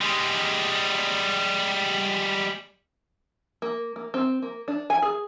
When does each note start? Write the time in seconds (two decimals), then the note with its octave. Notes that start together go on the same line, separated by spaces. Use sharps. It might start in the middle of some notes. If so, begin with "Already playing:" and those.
0.01 G3 G#3
3.62 A#3
3.96 A#3
4.14 C4
4.42 A#3
4.68 D4
4.90 G#5
5.02 G#4